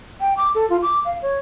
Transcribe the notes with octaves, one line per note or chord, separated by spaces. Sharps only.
G5
D6
A4
F4
D6
F5
C#5